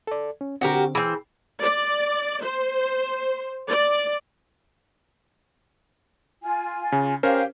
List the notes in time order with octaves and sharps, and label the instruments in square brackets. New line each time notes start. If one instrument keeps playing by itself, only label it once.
[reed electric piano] A4 D5
C#4
[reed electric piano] D3 C4 [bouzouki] F#4 G4 A#4
[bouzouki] E3 C4 [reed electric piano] G#4
[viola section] D5
C5
D5
[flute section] F4 G#5
[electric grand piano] C#3
[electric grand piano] C#4 A#4 C5 [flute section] G4 F5